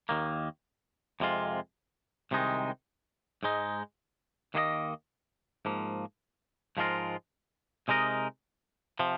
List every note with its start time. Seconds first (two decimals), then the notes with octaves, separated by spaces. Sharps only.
0.09 D#2 D#3 A#3
1.20 F2 C3 G#3 F4
2.31 C2 C3 D#3 G#3 D#4
3.43 G#2 G#3 D#4
4.54 D#2 D#3 A#3 G#4 D#5
5.65 G#2 F3 A#3
6.77 G#2 F3 G#3 F4 A#4
7.88 C3 G#3 D#4 A#4 D#5
8.99 C3 F3